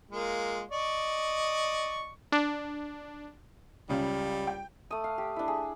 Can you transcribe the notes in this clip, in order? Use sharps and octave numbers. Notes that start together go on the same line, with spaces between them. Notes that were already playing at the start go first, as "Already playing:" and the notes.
G#3 A#3 F4
D5 D#5 C#6
D4
C#2 C#3 G3
G5
A3 D#6
F5
G4
D4 E4
G#4